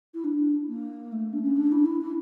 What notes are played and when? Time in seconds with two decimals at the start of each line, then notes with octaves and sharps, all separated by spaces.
0.14 E4
0.23 D4
0.68 A#3
1.12 A3
1.32 D4
1.41 C#4
1.56 D4
1.71 E4
1.77 D4
1.85 E4
2.00 E4